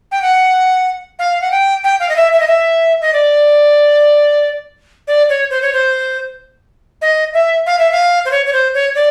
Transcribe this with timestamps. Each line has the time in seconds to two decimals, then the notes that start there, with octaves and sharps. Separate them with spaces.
0.12 G5
0.22 F#5
1.19 F5
1.41 F#5
1.51 G5
1.84 G5
2.00 F5
2.09 D#5
2.16 E5
2.33 E5
2.40 D#5
2.47 E5
3.01 D#5
3.13 D5
5.08 D5
5.29 C#5
5.50 C5
5.62 C#5
5.73 C5
7.02 D#5
7.34 E5
7.66 F5
7.79 E5
7.92 F5
8.25 C5
8.31 C#5
8.46 C#5
8.53 C5
8.74 C#5
8.95 D5